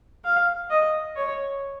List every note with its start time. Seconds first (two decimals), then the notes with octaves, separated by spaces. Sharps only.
0.24 F5
0.70 D#5
1.16 C#5